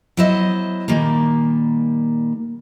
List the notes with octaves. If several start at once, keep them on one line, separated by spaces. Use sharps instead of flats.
F#3 B3 E4 C5 D#5
A#2 D#3 G3 A#3